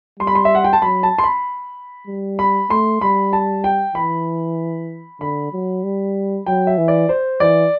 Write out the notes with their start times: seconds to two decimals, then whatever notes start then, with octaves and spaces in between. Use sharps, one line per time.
0.19 G3 C6
0.27 B5
0.35 C6
0.45 E5
0.55 F#5
0.64 G5
0.73 A5
0.82 F#3 B5
1.03 A5
1.18 C6
1.24 B5
2.07 G3
2.39 B5
2.70 A3 C6
3.01 G3 B5
3.33 A5
3.64 G5
3.95 E3 B5
5.20 D3 B5
5.52 F#3
5.84 G3
6.46 F#3 G5
6.67 E5
6.78 E3
6.88 D5
7.09 C5
7.40 E3 D5